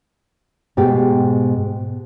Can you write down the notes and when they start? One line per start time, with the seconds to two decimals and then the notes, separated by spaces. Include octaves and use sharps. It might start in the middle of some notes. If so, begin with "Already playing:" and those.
0.77 G#2 B2 G4